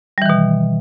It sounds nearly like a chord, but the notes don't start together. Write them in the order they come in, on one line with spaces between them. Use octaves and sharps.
G3 E3 D#3 B2